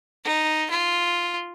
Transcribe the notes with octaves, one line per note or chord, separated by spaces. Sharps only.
D#4
F4